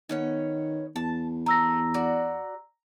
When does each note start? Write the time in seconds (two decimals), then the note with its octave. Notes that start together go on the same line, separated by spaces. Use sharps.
0.09 D#3 B3 C#4 C#5
0.96 E2 A5
1.46 A3 A#5 E6 A#6
1.94 F#4 D5